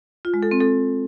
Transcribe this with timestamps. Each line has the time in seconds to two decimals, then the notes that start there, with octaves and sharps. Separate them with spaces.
0.25 F4
0.34 G#3
0.43 A4
0.51 C4
0.60 A4